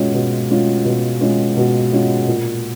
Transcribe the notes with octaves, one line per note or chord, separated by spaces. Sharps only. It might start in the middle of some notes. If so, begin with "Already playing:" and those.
Already playing: B2 G#3 C#4 F4
B2
G#3 C#4 F4
B2
G#3 C#4 F4
B2
G#3 C#4 F4
A#2